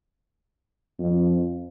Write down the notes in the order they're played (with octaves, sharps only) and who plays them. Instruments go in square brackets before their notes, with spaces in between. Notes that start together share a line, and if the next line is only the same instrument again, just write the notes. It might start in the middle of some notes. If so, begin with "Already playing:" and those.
[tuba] F2